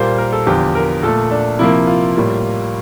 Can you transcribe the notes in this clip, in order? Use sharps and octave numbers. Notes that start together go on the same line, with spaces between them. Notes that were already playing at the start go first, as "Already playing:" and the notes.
Already playing: A#2 G3 A#3 C5
A#4
A4
E2 D3 F3 G4
A#4
A#2 A3 A4
D4
C3 F3 A#3 E4
F4
A2 G3 A#3